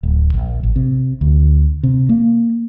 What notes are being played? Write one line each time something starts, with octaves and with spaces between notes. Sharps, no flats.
D1
A#1
A1
C3
D2
C3
A#3